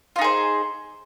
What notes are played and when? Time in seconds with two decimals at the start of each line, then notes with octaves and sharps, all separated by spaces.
0.16 F4
0.19 D#4
0.21 G#4
0.24 C5